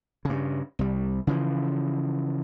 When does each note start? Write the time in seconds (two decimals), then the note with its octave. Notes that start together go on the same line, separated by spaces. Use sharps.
0.25 G2 C#3
0.79 C2 G3
1.27 C#3 E3 F3